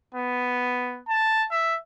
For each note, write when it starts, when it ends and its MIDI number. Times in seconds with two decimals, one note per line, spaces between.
0.15 1.01 59
1.09 1.45 81
1.51 1.76 76